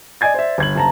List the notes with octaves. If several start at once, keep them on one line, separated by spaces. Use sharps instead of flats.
D5 D#5 G#5 G#6 A6
C5 D5 E5
G1 G#6 F#7
F#1 A5 A#5